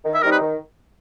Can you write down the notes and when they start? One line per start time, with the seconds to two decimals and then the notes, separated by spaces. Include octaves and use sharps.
0.05 D#3
0.14 E5
0.22 G3 C4 D#4 A#4
0.32 B4
0.40 D#3